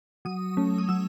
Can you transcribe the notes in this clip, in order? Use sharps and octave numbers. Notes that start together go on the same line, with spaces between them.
F#3 D#6
A3 C#4
D#6
F#3 E6